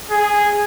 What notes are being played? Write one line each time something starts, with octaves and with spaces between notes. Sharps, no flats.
G#4